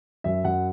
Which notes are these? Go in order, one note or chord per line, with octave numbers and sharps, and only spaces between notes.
F#2 E5
F#2 F#5